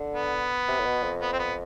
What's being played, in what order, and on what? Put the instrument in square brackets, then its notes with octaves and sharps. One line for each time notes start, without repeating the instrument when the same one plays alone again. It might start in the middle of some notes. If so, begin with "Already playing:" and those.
Already playing: [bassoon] D3
[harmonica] B3
[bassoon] C3
A2
B2
F2
[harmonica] B3
C4
B3